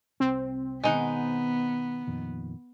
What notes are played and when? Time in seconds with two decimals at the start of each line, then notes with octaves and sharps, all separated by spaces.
0.20 C2 C4
0.84 B2 D#3 G#3 B3 D#4 F#5
2.07 F2 A#2 D#3